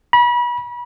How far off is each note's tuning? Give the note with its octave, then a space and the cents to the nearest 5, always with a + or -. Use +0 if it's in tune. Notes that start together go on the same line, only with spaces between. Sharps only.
B5 -35